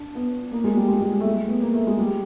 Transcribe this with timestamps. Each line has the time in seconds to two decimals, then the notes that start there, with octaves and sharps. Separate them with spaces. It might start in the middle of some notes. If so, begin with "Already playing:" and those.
Already playing: D4
0.15 B3
0.52 A#3
0.64 G#3
0.76 G3
0.88 G#3
1.02 G#3
1.20 A3
1.25 G#3
1.48 B3
1.61 A#3
1.74 A3
1.87 G#3
1.98 G3